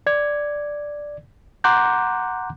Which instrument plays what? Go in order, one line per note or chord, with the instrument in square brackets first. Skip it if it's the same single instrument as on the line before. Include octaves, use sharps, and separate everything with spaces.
[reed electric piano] D5 G#6
F#5 A#5 C6 D6 F#6 G6